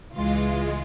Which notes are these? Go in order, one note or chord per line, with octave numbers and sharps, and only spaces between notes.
C#2 E3 G#3 F4